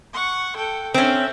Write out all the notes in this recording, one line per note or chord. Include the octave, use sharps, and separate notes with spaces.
F#5 C#6
A4 G5
C4 C#4 E5